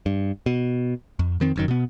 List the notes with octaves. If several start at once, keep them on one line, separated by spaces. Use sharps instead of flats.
G2
B2
F2
F2 D#3 C4
F1 F#2 D#3
B2 B3